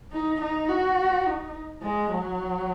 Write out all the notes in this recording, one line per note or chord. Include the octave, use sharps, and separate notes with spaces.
D#4
D#4
F#4
D#4
G#3
F#3